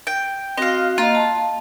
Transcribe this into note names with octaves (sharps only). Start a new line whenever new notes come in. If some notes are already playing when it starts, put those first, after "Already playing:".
G5
C4 F#4 D#5 F5
A#3 F4 D#5
A5